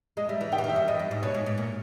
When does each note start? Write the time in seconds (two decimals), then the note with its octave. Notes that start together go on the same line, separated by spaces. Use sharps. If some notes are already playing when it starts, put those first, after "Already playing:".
0.17 G#3 D#5
0.28 G3 E5
0.40 E3 E5
0.52 D#3 G5
0.58 E3
0.64 D#3
0.69 E5
0.76 G2
0.88 E2 D#5
1.00 G2
1.11 G#2
1.22 B2 C#5
1.34 G#2
1.46 G#2
1.58 A#2